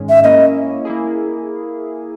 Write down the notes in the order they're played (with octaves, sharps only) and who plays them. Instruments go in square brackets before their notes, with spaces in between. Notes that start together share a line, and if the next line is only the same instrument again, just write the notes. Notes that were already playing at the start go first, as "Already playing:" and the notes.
Already playing: [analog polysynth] G#2 D#3 G#3 C#4
[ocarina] E5
[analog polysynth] A#3 C#4 E4 [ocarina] D#5
[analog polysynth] A#3 E4 G#4